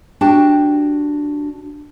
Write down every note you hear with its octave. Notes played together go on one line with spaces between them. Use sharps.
D4 F#4 G4 G5 A5